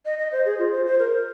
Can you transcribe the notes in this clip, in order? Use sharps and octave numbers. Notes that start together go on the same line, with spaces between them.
D#5
D#5
C5
G#4
F4
C5
C5
A#4